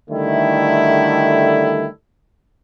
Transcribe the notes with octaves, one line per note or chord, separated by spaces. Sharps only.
D3 D#3 G3 A3 E4